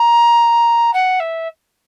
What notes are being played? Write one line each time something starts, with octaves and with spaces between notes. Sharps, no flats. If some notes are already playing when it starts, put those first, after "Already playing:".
Already playing: A#5
F#5
E5